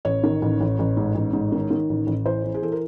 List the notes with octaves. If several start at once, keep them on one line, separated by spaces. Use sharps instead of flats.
A1 C#5
D#3
A1
A1
A1
G#2
A1
G#2
D#3
D#3
A1
A1
E3 C5
E3
G#4
E3 A4
A#4